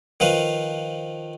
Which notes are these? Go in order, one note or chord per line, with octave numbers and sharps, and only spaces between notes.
D#3 F3 B4 F5